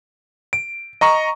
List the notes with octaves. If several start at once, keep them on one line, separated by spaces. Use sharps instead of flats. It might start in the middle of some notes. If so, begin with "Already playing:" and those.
D7
D#5 A#5 C#6